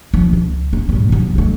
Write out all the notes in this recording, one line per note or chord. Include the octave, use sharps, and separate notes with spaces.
C#2 F3
C#2
G#3 A#3
G#2 G3
C2 F#2
G3 A3